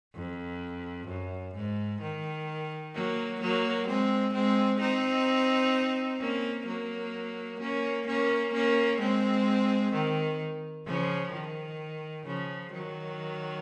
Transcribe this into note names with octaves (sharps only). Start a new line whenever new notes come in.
F2
F#2
G#2
D#3
F#3 A#3
F#3 A#3
G#3 C4
G#3 C4
C4 D#4
A#3 C#4
F#3 A#3
A#3 C#4
A#3 C#4
A#3 C#4
G#3 C4
D#3
C#3 F3
D#3
C#3 F3
D#3 F#3